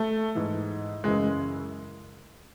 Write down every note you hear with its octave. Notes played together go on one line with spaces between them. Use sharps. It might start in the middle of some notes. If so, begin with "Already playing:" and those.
Already playing: A3
G#2 E3
F#2 C#3 E3 G#3